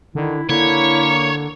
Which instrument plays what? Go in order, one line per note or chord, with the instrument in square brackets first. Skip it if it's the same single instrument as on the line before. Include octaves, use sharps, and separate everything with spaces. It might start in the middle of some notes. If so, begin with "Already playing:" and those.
[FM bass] D3 [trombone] D#3 [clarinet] E4
[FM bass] D3 [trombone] A#3 [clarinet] E4 [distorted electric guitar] C#5